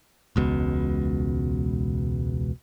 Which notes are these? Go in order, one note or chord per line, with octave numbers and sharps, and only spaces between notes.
E1 C#2 B2